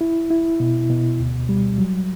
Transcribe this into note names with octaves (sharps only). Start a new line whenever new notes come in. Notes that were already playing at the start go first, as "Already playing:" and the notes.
E4
E4
B2
B2
D2
G3
F#3